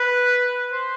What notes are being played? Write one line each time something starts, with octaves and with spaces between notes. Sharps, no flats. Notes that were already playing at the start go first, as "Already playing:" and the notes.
Already playing: B4
C5